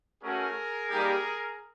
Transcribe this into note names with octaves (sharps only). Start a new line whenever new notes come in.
A3 C#4 F#4 G#4 A#4
G3 A#3 D#4 G4